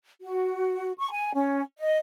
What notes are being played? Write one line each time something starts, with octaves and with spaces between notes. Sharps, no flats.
F#4
C#6
G#5
C#4
D#5